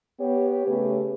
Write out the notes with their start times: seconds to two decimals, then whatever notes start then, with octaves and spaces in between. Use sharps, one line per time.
0.20 B3 G4 C#5
0.67 C#3 A3 C#4 G4 G#4 B4